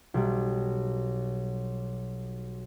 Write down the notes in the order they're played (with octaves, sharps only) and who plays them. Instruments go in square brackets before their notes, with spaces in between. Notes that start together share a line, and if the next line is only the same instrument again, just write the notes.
[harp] B1 G3